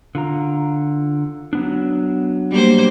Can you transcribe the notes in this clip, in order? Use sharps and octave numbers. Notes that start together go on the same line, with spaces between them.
D3 F4 A#5
F#3 B3 D4
G3 A#3 C5